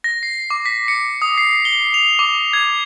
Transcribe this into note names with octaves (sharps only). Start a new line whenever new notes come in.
A#6
C7
D6
B6
C#7
D#6
C7
G7
F7
D6
G#6